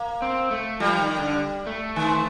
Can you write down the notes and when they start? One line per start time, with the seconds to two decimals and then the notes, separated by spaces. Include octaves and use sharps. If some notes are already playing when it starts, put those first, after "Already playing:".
Already playing: A#3
0.22 C4
0.51 A3
0.80 F3 G3
0.99 D#3
1.19 D3
1.67 A3
1.96 D#3